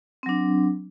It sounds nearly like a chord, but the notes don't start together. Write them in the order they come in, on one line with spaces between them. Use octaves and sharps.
C4 F#3 D4